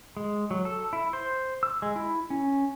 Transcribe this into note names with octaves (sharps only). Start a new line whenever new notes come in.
G#3
F#3
A4
E4
C5
E6
G#3
E4
C#4